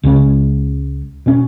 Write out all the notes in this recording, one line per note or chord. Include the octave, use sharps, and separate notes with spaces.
C#2 C#3 G#3 C#4
B2 F#3 C#4